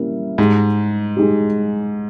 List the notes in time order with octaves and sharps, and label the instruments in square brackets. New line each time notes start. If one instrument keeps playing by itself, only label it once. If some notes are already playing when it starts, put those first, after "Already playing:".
Already playing: [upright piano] G3 A#3 C#4 E4
[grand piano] G#2 [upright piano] G#3 D#4 G4
[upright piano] G#3 D#4 G4